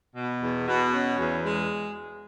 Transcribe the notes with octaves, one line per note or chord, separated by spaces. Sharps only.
B2
E2
B2
C#4
E2
G#3